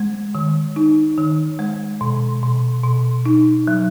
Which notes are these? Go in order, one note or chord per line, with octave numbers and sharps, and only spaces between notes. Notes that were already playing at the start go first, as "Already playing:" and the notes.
Already playing: G#3
D#3
D#4
D#3
G#3
B2
B2
B2
D#4
F#3